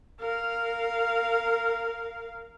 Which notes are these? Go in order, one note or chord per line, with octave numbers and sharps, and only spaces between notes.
A#4 F5